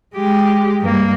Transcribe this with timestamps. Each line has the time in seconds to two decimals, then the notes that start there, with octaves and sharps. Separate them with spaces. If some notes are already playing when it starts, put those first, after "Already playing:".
0.15 G#3 G4
0.81 G2 A#3